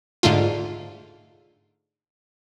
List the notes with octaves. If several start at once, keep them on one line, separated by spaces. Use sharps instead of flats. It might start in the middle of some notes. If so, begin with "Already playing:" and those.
G#2 D3 A3 F4